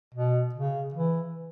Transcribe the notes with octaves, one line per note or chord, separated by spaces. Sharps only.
B2
C#3
E3